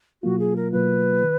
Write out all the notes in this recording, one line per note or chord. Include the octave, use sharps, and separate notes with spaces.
B2 F#3 A#3 F4 F#4
G#4
A#4
B2 F#3 A#3 F4 B4
D#3